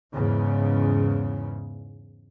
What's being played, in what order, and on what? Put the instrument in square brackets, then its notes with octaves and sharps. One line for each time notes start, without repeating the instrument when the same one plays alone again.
[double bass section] E2 G#2 C#3